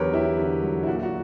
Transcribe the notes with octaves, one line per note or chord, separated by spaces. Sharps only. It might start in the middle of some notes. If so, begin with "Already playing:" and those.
Already playing: E2 D3 F#3 G4 A#4 B4 C#5
E2 E4 G4
D3
F#3
E4
A#2 F#4
F#4